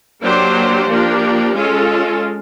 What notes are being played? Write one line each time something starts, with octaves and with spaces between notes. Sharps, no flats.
F#3 A#3 D4 G4 C5
F3 A#3 D4 G4
G#3 C#4 F4 A4